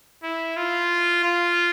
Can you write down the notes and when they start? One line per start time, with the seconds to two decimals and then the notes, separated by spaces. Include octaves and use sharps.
0.23 E4
0.57 F4
1.24 F4